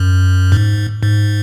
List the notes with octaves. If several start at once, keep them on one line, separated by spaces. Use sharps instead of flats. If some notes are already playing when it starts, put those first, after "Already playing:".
Already playing: F#2
G#2
G#2